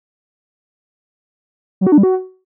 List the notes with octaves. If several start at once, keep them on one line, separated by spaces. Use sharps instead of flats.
F#3
F#4
D4
G3
F#4